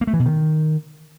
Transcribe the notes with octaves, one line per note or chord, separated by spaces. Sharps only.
A#3
A3
E3
B2
D#3